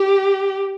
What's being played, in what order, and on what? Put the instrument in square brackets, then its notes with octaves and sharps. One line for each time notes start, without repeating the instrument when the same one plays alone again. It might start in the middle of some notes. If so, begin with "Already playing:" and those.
Already playing: [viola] G4